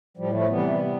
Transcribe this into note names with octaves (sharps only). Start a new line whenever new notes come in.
A2 F3 G3
F3 A3
C3 E3 G3 B3
C3 E3